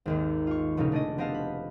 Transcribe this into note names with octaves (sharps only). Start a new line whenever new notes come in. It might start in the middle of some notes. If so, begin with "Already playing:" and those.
G#1 D#2 D#3
F4 C#6
F1 A#2 C#3 C#4 D#4 E4
A3 D4 G#4 D#5
B3 C4 G4 D#5 F5 A5
B5